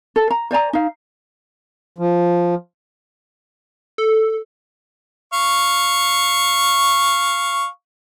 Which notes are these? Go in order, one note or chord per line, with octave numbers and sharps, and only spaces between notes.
A4
A#5
C5 D5 G#5 A#5
D#4 F5
F3
A4
F5 C#6